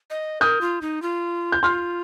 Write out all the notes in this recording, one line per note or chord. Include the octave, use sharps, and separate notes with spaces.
D#5
A#4 D#6 G6
F4
D#4
F4
G6
F4 C6 F6